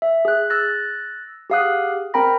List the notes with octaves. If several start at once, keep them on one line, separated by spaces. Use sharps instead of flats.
E5
G#4 F#6
E6 F#6 A6 A#6
G4 G#4 F5 F#5 D#6 F#6
C4 A#4 G5 A#5 B5 A#6